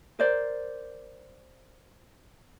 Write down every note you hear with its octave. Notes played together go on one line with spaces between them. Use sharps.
A#4 C5 D5